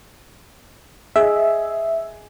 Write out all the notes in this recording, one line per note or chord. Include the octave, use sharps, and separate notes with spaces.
G#4 D#5 E5